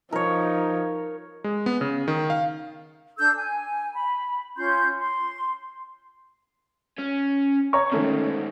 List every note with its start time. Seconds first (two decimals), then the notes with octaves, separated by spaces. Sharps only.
0.12 F3 D#4 A#4 C#5
1.44 G#3
1.66 B3
1.81 C#3
2.08 D#3
2.30 F5
3.18 D4 A4 E6 G6
3.37 G#5
3.95 B5
4.58 C#4 F4 C6 G6
4.99 C6
6.99 C#4
7.73 C#5 A#5 C#6
7.92 G#2 B2 D#3 A3 C#4